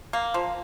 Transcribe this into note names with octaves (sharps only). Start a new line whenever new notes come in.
A#3
F3